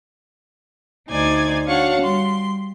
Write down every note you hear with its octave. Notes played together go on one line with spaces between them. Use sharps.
D2 D#4 C5 D5 G#5 G#6
D4 F#4 C#5 F5 F#5 C#6
G3 C6